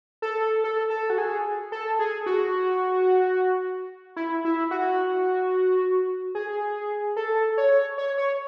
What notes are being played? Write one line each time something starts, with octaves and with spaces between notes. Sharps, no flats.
A4
A4
A4
F#4
G#4
A4
G#4
F#4
E4
E4
F#4
G#4
A4
C#5
C#5
C#5